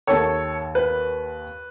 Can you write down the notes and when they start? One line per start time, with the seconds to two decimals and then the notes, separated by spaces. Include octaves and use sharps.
0.07 D#2 D#3 A4 C#5
0.75 B4